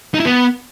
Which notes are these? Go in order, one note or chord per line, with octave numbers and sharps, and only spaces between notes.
D#4
E4
B3